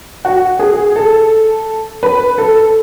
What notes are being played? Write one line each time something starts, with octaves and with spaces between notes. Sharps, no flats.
F#4
G#4
A4
B4
A4